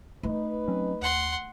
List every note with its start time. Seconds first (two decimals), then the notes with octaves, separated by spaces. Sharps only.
0.23 A3 D#4 B4
0.68 F#3 C4 C#4
1.02 D#2 F#5 C6